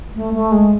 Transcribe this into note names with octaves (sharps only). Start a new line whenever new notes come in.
A3
A3
G#3